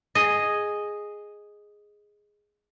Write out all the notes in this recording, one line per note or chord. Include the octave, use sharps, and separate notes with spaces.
G#4 D#5